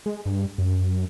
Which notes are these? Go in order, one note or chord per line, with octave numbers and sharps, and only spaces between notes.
G#3
G2
F#2